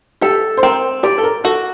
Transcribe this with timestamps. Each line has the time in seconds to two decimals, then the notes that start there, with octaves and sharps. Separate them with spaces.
0.21 G4 A4
0.57 C5
0.63 C4 A#4
1.03 G4 D5
1.18 A4
1.24 A#4
1.44 F#4 A4